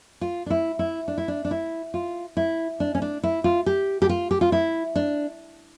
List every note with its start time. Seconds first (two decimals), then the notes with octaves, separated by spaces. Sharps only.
0.21 F4
0.46 D4
0.50 E4
0.79 E4
1.08 D4
1.18 E4
1.28 D4
1.45 D4
1.51 E4
1.94 F4
2.37 E4
2.80 D4
2.95 C#4
3.02 D4
3.24 E4
3.44 F4
3.66 G4
4.02 G4
4.09 F4
4.31 G4
4.41 F4
4.52 E4
4.96 D4